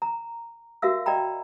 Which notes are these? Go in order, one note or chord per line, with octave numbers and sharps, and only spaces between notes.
A#5
F#4 A#4 E5 F5 E6
D5 D#5 G5 A#5 B5